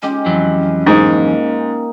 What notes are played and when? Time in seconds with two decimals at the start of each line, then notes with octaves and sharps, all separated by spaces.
0.03 G#3 C#4 G4
0.26 F2 E3 F#3
0.86 G#2 A#3 D#4